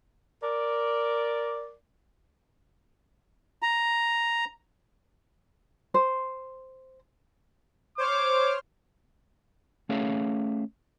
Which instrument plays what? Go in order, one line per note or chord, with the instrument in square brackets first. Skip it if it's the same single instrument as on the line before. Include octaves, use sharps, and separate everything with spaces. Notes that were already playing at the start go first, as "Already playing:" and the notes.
[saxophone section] A#4 D5
[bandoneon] A#5
[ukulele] C5
[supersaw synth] C5 C#5 F6 [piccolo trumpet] D6
[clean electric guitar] A3 C#4 G#4 C#5 E5 F5